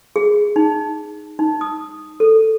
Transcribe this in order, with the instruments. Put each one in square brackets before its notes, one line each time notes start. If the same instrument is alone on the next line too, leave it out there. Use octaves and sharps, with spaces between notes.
[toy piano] G#4
D#4
D#4
D#6
A4